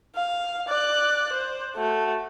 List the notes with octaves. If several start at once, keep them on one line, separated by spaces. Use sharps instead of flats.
F5
D5 F#6
C5
A3 F#4